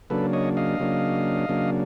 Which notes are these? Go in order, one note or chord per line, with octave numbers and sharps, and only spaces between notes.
C#3 F#3 A#3 D4 A4 B4
C#5 D#5
D#5 F5
C#3 F#3 A#3 D4
C#3 F#3 A#3 D4